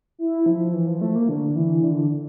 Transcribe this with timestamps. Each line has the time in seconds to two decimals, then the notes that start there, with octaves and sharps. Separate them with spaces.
0.19 E4
0.46 F3
0.74 E3
0.87 F3
1.01 A3
1.15 A#3
1.29 D3
1.56 E3
1.84 D3
2.11 D3